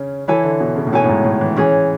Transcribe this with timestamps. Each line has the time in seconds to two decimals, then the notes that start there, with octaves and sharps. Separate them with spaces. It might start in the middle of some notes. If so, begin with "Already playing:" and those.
Already playing: C#3 C#4
0.28 E3 E4 A4 C#5 G#5
0.44 D3
0.60 B2
0.76 C#3
0.87 A2
0.93 B2 E4 A4 C#5 G#5
1.04 A2
1.09 G#2
1.24 A2
1.41 E3
1.56 E3 C#4 G#4 C#5